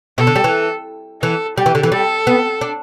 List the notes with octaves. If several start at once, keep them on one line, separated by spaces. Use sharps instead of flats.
B2 A4
D3
G3
E3
E3 A4
G3 G4
E3
D3
E3
G3 A4
B3
D4